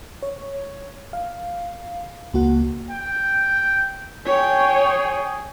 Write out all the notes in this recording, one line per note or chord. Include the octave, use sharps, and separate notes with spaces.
C#5
F5
C#2 A#3 F#4 F#5
G5
G#4 C#5 G5